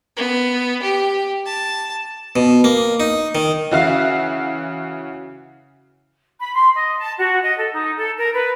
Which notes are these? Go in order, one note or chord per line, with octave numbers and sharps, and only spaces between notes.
B3
G4
A5
B2
A#3
D#4
D#3
C#3 E3 F#4 E5 F5
B5
C6
D#5
A5
F#4
D#5
A4
D#4
A4
A#4
B4